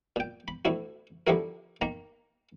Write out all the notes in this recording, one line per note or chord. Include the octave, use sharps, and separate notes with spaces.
A#2 G5
B5
D2 A2 E4 F#4
D3 F3 G3 E4 F#4 A#4
D#3 A#3 A#5